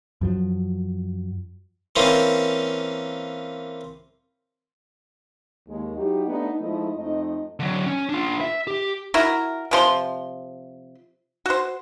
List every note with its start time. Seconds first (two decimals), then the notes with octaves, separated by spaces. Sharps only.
0.21 F#2 F3 F#3
1.96 E3 A#3 C4 C#4
5.68 D#2 G#3
5.96 F#3 D#4 E4 F#4 G4
6.28 A3 B3 D4 D#4
6.60 F3 G#3 A3 D#4 E4 D#5
6.96 F2 A3 D#4 D#5
7.60 D3 F#3
7.86 C#4
8.09 D4 F4
8.41 E5
8.67 G4
9.14 E4 F#4 A#4 A#5
9.71 C3 F3 C6
11.46 F#4 C5